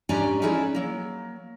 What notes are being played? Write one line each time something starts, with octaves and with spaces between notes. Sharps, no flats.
G#2 C#4 D4 G4 G#5 A#5
C#4 D#4 E4 G#4 D5
F#3 A#3